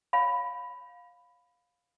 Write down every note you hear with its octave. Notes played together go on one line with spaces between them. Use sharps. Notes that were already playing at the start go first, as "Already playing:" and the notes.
C#5 F5 B5